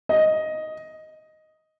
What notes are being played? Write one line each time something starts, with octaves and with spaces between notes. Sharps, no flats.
D#5